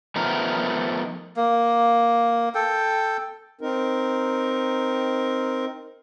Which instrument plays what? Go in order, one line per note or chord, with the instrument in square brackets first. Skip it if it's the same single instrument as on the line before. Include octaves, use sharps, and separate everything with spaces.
[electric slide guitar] F3 A3 B3 D#4 A#4
[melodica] A#3
A4 G5
[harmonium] C4 D#4 A#4